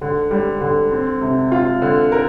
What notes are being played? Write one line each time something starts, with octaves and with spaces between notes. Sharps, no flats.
D3
G3
D3
C4
C3
F4
D3
A#4